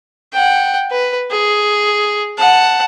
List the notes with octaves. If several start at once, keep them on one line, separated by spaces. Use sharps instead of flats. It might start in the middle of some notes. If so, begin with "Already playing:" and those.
F#5 G5
B4
G#4
F#5 A5